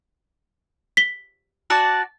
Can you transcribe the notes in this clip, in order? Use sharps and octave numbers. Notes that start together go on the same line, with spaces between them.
B6 G7
F#4 D5 A5